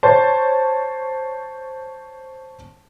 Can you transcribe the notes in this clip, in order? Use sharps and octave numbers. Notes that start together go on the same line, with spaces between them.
C5 C#5 A5